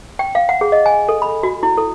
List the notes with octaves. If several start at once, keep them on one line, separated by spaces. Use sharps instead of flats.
G5
F5
F#5
G#4
D#5
G#5
A4
B5
F#4
E4
A4